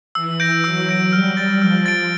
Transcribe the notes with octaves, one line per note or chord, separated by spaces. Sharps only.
E3 E6
G6 A#6 D7
F#3 E6
G6 A#6 D7
G3 F6
A6 D7
F3 F6
A6 D7